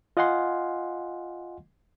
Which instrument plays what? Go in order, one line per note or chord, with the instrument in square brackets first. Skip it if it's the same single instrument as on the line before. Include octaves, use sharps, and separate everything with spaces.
[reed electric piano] F4 D#5 F5 F#5 G#5 C6